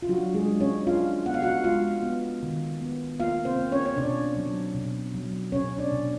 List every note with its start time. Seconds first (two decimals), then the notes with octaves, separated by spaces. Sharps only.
0.02 F4
0.09 F#3 D4 F#4
0.34 G#3 G#4
0.48 D4
0.60 C#4 C#5
0.87 D4 F4 F5
1.26 B3 F#5
1.34 F5
1.42 F#4 F#5
1.64 G#3 F4 F5
2.03 B3
2.43 D#3
2.82 B3
3.20 A#3 F4 F5
3.45 C4 C5
3.59 A#3
3.72 C#4 C#5
3.86 C#5
3.97 B2 D4 D5
4.37 F#3
4.75 B2
5.15 F#3
5.52 B2 C#4 C#5
5.78 D4 D5
5.92 B2